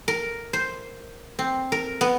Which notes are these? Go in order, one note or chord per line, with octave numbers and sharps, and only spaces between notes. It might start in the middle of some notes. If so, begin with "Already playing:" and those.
A#4
C5
C4
A#4
B3